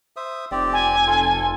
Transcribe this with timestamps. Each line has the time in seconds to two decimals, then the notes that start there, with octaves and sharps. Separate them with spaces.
0.16 C5 E5 D#6
0.51 F1 C4 G4 D5
0.73 G#5
1.07 F4 A4